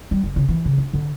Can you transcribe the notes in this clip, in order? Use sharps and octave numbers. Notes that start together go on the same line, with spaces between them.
G3
F#1
C#3
E3
C#3
D4
D3